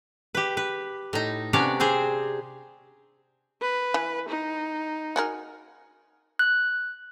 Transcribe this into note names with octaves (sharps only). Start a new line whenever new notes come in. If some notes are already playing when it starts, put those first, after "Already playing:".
G4 B4
B4
A2 D#4
C3 B3 C#4 D4 C#5 D5
C4 G4 G#4 C5
B4
E3
D#4
F#4 G#4 A#4
F#6